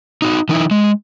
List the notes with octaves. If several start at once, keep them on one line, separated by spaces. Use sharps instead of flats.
D#4 F#4
E3 D#4 E4
G#3